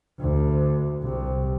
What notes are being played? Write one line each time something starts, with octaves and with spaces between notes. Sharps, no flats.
D2
C2